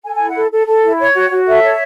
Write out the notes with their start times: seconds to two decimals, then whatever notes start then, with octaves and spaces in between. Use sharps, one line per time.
0.04 A4 G#5
0.15 E4 G#5
0.28 F#5
0.36 A4
0.51 A4
0.68 A4
0.83 E4
0.99 C#5
1.15 F#4
1.30 F#4
1.47 A4 E5
1.63 C#5